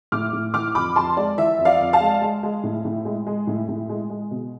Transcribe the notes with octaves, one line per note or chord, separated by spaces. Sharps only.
A2 D6 F6
A2
E3 D6 F6
F2 B5 D6
F2 A5 C6
G#3 D5
E3 E5
F2
D5 F5
F2
F5 A5
G#3
G#3
G#3
A2
A2
G#3
G#3
A2
A2
G#3
G#3
B2